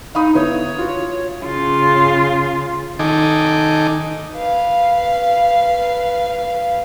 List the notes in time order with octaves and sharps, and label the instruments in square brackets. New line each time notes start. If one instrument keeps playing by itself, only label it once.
[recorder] D#4 [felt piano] F5 B5 D#6
[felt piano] D3 B3 E4 [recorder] C#5
[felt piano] F4 F#4
[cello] C#3 F4
[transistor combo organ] D#3 D#4 A4 G#5 D6
[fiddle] B4 F5